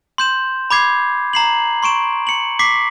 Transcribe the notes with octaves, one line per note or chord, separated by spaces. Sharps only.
C6 G6 E7
B5 D6 G#6 C7
A#5 C7 F#7
C6 C#6 D7 E7
C#7 F#7
D6 B6 C7